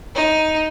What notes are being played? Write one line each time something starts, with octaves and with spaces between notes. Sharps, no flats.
D#4